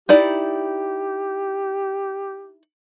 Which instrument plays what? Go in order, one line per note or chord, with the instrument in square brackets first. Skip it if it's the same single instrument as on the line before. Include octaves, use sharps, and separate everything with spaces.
[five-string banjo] D#4 E4 D5 [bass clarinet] G4